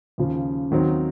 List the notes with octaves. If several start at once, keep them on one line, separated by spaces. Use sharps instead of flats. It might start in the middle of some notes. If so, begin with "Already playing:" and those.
D#2 C#3 F3
D#2 D#3 F#3 C4